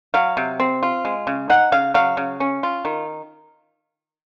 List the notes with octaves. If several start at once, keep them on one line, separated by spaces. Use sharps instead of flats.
F#3 F5
C3
C4
F4
G#3
C#3
D#4 F#5
C#3 F5
F#3 F5
C#3
C#4
F4
D#3